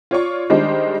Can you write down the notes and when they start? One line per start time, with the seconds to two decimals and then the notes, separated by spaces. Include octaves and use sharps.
0.11 F4 C#5 D5 C#6
0.50 D#3 G3 G#3 D4 C5